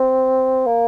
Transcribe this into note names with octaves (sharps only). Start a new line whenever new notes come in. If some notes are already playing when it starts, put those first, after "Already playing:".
Already playing: C4
A#3